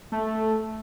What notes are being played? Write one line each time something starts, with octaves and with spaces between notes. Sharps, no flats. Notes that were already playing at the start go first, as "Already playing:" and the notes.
A3